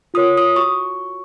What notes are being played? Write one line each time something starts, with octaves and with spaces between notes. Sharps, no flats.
F4 A#4 C#5 D#6
D#6
F#4 C#6